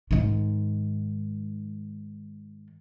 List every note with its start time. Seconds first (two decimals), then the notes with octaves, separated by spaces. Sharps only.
0.11 G#2 D#3